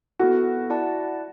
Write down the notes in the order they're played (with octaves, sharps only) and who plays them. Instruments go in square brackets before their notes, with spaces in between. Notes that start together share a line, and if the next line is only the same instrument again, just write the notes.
[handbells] B3 E4 A4 [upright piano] F#4
[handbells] E4 D5 F#5 A5